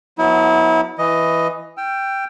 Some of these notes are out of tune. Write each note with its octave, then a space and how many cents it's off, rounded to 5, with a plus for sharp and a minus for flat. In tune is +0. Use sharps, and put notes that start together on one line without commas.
F#3 -20 B3 +0 E4 -30
E3 +5 D#5 +5
G5 +0 E6 +40